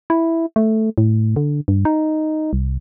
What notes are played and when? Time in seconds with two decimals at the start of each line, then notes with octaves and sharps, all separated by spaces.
0.10 E4
0.56 A3
0.98 A2
1.36 D3
1.68 G2
1.85 D#4
2.53 C2